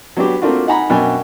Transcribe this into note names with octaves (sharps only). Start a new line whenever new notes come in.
F#3 B3 D4 F#4 G4
A3 A#3 C4 D4 F4 F#4
D#4 F#5 G#5 A#5 B5
F#2 B2 D4 G5 G#5